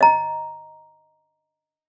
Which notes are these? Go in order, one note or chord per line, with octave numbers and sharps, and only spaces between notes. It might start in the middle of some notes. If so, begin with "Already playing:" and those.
D#5 A#5